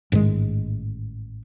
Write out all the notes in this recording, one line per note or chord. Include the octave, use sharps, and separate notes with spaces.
A1 G#2 D#3 G#3